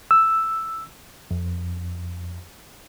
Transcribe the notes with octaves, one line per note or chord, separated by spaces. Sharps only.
E6
F2